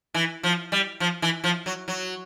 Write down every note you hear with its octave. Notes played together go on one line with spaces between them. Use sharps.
E3
F3
G3
F3
E3
F3
F#3
F#3